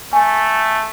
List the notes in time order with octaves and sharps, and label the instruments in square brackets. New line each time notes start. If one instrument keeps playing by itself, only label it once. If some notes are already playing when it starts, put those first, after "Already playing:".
[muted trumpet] A3 [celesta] G#5